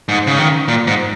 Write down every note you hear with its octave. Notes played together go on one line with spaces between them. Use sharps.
G#2
C#3
D#3
A#2
G#2